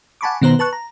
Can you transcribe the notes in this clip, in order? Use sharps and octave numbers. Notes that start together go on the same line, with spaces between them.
F#5 G#5 A5 B5 C#6 D6
B2 D#3 B3 B4 C5 A#5
B4 A5 C#6 F#6
A#5